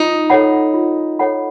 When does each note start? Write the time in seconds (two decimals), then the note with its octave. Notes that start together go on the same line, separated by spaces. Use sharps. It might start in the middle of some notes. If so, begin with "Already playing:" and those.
Already playing: D#4 F4
0.30 A4 C#5 F#5 B5
0.74 F4
1.19 A4 C#5 F#5 B5